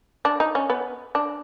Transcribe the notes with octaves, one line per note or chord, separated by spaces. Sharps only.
D4
D#4
C#4
B3
D4